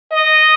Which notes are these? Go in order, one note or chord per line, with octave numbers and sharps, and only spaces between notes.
D#5